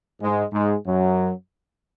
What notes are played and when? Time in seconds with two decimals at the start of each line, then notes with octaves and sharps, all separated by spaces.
0.21 G#2 G#3
0.52 G#2 G#3
0.85 F#2 F#3